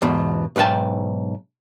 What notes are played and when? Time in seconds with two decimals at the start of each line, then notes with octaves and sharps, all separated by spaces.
0.02 E2 G#2 B2
0.56 B1 G#2 B4 G5 A5